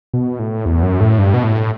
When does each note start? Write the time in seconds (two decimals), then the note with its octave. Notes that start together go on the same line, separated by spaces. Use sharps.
0.14 B2
0.39 A2
0.66 E2
0.83 F#2
1.01 A2
1.19 G2
1.34 B2
1.43 A2